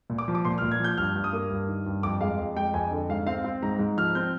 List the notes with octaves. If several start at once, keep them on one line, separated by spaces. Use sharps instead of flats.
A#2
D6
F3
D6
A#2 C6
A#2 F6
G#6
F3 G6
G2 F6
G2
D#6
A#3
G2
D#3
G2
F2 D6
G#3 F5
F2
G#3 G5
F2 G#5
D3
G#2 F5
C4 F5
C4
G#2 A#5
G#2
F3 F6
C4 G6